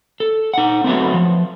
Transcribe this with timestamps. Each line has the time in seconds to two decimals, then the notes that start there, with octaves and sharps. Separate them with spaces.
0.20 A4
0.54 D#4 F#5
0.84 F#3 A3 B3 C4
1.14 F3